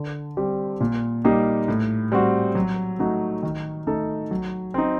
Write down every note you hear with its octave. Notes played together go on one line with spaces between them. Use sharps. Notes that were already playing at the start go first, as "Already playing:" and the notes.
Already playing: D3
G3 C4 G4
A#2
G3 A#3 D#4 G4
A2
G3 C4 F#4
F#3
A3 D#4 F#4
D#3
A3 D#4 A4
F#3
C4 D#4